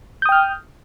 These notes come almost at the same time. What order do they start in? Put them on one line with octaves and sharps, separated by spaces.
G6 D#6 G5 F6